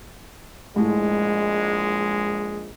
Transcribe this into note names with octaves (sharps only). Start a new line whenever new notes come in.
A#1 G#2 G#3 A3 E4